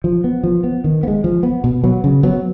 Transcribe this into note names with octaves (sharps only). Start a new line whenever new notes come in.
F3
B3
F3
B3
D#3
B3
G#3
F3
B3
B2
F#3 B3
C#3
F#3 B3